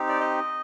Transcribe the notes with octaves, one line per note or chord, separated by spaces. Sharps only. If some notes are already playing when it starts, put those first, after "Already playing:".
Already playing: C4 D#4 G4
D5
D#5